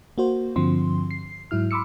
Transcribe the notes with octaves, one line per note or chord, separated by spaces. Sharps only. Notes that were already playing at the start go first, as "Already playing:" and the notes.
A#3 F#4 C5
G2 D3 F3 C4 C6
C7
G#2 F#3 E4 F6
B5 C6 D6 E6 C#7